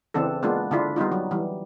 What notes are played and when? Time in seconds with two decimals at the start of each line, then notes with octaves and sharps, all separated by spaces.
0.14 C#3 E3 C4 D4 A4
0.43 G#3 A#3 B3 D4 F4
0.71 D3 D4 E4 F4
0.96 G3 B3 D#4 F4
1.12 F#3
1.31 E3 G3